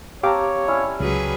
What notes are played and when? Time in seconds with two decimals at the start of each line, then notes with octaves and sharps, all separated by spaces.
0.23 C4 G4 C#5 F5 A5 A#5 D6
0.68 G3 C#4 E4
1.00 C#2 F#3 G#4 B4